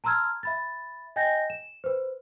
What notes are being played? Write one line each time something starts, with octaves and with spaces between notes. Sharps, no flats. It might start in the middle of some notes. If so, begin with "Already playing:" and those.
A5 A#5 C6 E6 F6 G#6
E5 B5 A6
D#5 G5 G#5 G6 A#6
E7
B4 C5